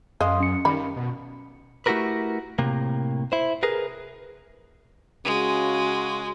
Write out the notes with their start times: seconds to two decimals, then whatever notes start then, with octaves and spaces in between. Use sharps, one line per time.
0.21 F#2 G#3 D#5 F5 C6 D#6
0.40 C#4 C#7
0.65 D#3 G3 B5
0.96 B2
1.86 A3 E4 F#4 G4 A#4 B4
2.58 A2 C3 A#3
3.32 E4 C5
3.63 G#4 A#4 B4
5.25 C#3 G#3 F#4